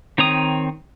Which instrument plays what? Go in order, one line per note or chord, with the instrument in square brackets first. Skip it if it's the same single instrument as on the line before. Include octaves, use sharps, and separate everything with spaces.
[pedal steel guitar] D#3 C4 C#5 A#5 D#6